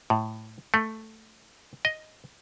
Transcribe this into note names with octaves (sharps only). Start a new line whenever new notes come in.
A2
A3
D#5